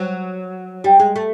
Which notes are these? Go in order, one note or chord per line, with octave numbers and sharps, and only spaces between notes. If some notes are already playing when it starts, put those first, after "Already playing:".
Already playing: F#3
G3
G#3
A3